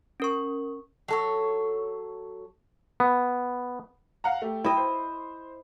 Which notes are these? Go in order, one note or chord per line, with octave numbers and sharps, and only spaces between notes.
C#4 A#4 C#6
F#3 A4 C#5
B3
F5 F#5 A#5
A3 G4
E4 D#5 G5
C5